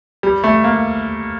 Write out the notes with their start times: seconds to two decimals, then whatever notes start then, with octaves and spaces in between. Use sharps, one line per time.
0.23 G3
0.44 A3
0.64 A#3